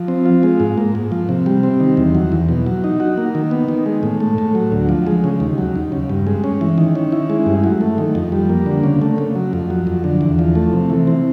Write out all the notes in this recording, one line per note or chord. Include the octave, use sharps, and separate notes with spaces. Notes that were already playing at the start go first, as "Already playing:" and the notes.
Already playing: F3
C4
F4
G#3
G#2
A#3
G#2
F3
C3
G3
C4
D#3
E2
F#3
E2
B2
F#3
D#4
F#4
A#3
D#3
B3
D#3
G#3
A2
A3
A2
F#3
D2
F3
G#3
C#3
D#2
F#3
D#2
C#3
G2
G#3
C#4
E3
D#3
C#4
E4
G#3
G2
F#3
A3
D#3
F2
G3
A#3
D3
C#3
A3
C#3
F#3
F2
F#3
F2
D3
E2
F3
A3
C3
E3
C4